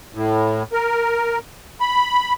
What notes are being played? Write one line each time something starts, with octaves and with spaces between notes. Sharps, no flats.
A2
A#4
B5